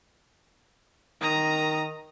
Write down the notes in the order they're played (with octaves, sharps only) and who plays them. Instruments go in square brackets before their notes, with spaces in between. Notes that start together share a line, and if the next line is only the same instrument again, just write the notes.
[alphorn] D#3 [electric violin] A#5 D#6